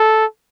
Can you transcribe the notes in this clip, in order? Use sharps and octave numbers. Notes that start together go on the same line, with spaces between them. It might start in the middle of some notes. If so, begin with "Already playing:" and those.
Already playing: A4